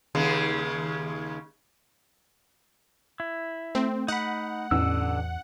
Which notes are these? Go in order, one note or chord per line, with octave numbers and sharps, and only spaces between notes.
D#2 C#3 G#3
E4
A3 C4
D#4 F#5 B5
A1 E2 D3 E6